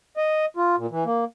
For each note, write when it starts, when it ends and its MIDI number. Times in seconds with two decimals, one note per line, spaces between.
0.17 0.45 75
0.57 0.76 65
0.77 0.86 46
0.91 1.04 52
1.05 1.24 58